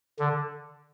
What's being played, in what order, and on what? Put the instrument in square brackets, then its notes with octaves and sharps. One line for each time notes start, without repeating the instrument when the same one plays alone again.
[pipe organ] D3